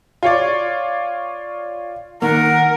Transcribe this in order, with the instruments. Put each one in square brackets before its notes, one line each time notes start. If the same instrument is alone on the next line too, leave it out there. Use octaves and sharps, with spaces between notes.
[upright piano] F4 C#5 D5
[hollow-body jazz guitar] D#3 A#3 [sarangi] A#4 [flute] F#5